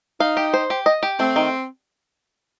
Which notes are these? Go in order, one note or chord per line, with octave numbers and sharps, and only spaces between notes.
D#4 F5
G4
C5
G4
D#5
G4
A3 C4
D#3